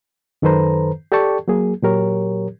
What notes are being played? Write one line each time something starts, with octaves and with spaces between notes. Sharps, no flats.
F#2 D#3 A4 B4 C5 A#5
G4 A4 D5 G5 A5 C#6
F#3 A#3 G#4
A#2 F#3 G4 A#4 C#5